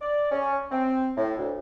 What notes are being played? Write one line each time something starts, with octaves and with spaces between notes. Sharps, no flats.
D5
C#4
C4
A2
D2